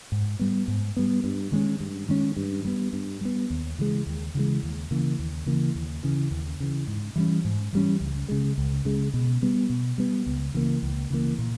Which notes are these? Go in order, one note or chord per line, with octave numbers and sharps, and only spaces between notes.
G#2
G3 B3
G#2
G3 B3
G2
D#3 G#3 C#4
G2
D#3 G#3 C#4
G2
G3 B3
G2
G3 B3
D#2
C#3 E3 G#3
D#2
C#3 E3 G#3
D#2
C#3 E3 A#3
D#2
C#3 E3 A#3
D#2
C#3 E3
D#2
C#3 E3
G#2
E3 G3 C#4
G#2
E3 G3 C#4
C#2
C#3 G#3
C#2
C#3 G#3
B2
G3 B3
B2
G3 B3
C#2
C#3 E3 A#3
C#2
C#3 E3 A#3
A#2